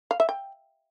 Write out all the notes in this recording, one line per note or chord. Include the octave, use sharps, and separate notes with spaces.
F5
E5
G5